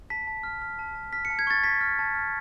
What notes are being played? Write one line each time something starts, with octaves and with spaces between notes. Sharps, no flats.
A5 B6
A5
F6
F6
A5
A5
F6 B6
C#7
A5
G#6
C#6 A6
A5 B6
F6
A5
F6